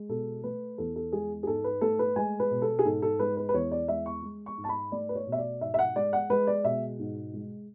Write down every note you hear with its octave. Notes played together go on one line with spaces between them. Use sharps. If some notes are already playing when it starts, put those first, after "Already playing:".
Already playing: G#3
B2 A4
A3 B4
E2 A4
A4
G#3 G#4
G#4
G#2 A4
B4
A3 A4
B4
G#3 G#5
B4
B2
A4
G#4
G#2 A4
A4
G#3 B4
B4
B4
E2 C#5
D5
G#3 E5
C#6
G#3
C#6
G#2
A5
B5
A3 D5
B4
C#5
B2
E5
D5
G#2 E5
E5
F#5
G#3 D5
F#5
G#3 B4
D5
B2 E5
G#2
G#3